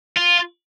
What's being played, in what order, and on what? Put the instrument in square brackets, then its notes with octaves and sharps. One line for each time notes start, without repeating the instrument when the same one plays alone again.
[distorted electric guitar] F4